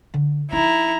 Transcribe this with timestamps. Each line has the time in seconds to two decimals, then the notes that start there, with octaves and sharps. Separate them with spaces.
0.14 D3
0.52 F3 D#4 E4 A#5